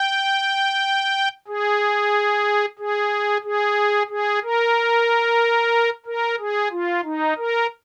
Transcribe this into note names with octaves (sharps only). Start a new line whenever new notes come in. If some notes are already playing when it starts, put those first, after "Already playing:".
Already playing: G5
G#4
G#4
G#4
G#4
A#4
A#4
G#4
F4
D#4
A#4